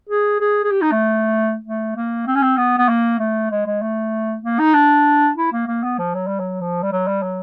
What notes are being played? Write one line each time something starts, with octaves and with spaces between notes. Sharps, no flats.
G#4
G#4
G#4
G4
D#4
A3
A3
A#3
C4
C#4
C4
B3
B3
A#3
A3
G#3
G#3
A3
A#3
D#4
D4
E4
A#3
A#3
B3
F3
F#3
G3
F#3
F3
G3
F#3
G3
F#3